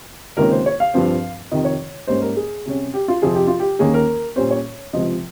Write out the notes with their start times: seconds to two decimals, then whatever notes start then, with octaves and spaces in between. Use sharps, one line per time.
0.37 C#2 C3 D#3 A#3 C#4 A#4
0.51 C5
0.66 C#5
0.80 F5
0.94 G2 F3 C4
1.51 F2 C3 D#3 D#5
1.65 C#5
2.07 G#2 G3 A#3 C#4 C5
2.22 A#4
2.36 G#4
2.66 C3 G3 C#4
2.94 G4
3.08 F4
3.22 F2 C3 F3 C4 G#4
3.35 G4
3.47 F4
3.60 G4
3.79 D#2 D#3 A#3 C#4 G#4
3.94 A#4
4.36 A#2 G3 C#4 C5
4.51 C#5
4.93 C#2 C3 F3 D#5